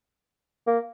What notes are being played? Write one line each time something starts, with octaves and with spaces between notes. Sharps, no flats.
A#3